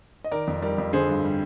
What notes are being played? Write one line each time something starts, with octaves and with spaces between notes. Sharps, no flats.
D#5
D#3 A#4 D5
F2
G3 A#4 D5
F2
D3 G#4 C5
G2
G3